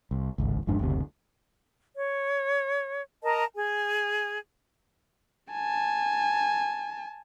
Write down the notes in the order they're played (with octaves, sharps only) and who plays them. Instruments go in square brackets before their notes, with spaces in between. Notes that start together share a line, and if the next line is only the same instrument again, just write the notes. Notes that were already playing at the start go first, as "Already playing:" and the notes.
[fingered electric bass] C2
D1 G#1 C#2
G#1 F2 G#2 D4
F#1 D2 C3
[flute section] C#5
A#4 D#5 A5 A#5
G#4 G#5
[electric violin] G#5 A5